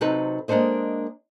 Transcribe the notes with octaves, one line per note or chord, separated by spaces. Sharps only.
C3 F#3 D#4 A4 B4 C5
G#3 A#3 D4 A4 C5 D#5